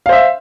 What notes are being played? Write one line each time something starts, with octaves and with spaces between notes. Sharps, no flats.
C5 E5 F5